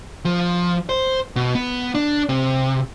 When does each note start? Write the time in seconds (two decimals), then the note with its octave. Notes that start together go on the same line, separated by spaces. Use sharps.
0.25 F3
0.89 C5
1.36 B2
1.55 B3
1.95 D4
2.29 C3